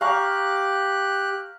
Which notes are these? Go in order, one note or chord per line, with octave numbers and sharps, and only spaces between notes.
G4 F5 A#5 C#6 F#6